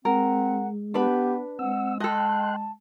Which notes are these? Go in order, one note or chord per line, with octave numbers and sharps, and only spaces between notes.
G#3 C4 A#4 F#5
B3 D4 G4 B4 B5
G#3 C4 F#5 E6
A4 D#5 G5 A5 C6 F#6